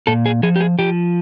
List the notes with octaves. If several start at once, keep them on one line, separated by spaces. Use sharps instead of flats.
A#2 A4
G#4
F3 G#4
G4
G#4
F3 G4